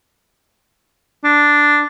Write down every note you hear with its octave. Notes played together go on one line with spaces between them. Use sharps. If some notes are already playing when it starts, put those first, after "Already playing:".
D4